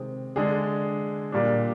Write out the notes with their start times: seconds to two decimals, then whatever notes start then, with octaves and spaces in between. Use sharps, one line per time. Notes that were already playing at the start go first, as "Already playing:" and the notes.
Already playing: C3 D#3 G#3 C4
0.36 D3 G#3 D4 G#4
1.32 A#2 G3 D4